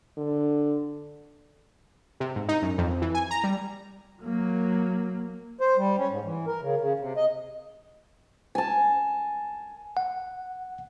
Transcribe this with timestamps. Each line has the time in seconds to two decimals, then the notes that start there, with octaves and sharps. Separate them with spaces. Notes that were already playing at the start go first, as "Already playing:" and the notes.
0.18 D3
2.20 C3
2.36 G#2
2.49 D#4
2.62 F#2
2.78 F2
3.02 E3
3.15 G#5
3.31 A#5
3.44 G3
4.22 F#3 A#3
5.61 C5
5.77 G3
5.98 C#4
6.11 G#2
6.25 E3
6.47 A#4
6.61 C#3
6.81 C#3
7.00 C3
7.17 D#5
8.55 G#5 A5
9.97 F#5